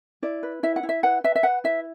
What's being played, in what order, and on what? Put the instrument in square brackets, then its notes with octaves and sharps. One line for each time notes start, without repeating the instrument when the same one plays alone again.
[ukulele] E4 D5
B4
E4 E5
F#5
E4
E5
B4 F#5
B4 E5
E5
B4 F#5
E4 E5